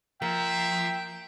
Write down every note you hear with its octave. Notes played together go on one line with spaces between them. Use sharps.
F3 A#3 E5 G5